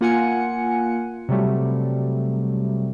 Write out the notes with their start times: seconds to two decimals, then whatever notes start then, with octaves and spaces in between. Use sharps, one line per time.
0.01 A#3 F4 F#5 G#5 C#7
1.29 C3 F#3 G3 A3